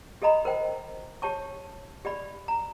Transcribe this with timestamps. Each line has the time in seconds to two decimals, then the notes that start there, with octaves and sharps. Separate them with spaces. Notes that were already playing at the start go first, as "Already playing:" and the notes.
0.22 G4 A4 D#5 A#5 B5
0.45 A#4 C5 G5
1.22 G4 C#5 A5 C#6
2.05 G4 D5 B5
2.48 A#5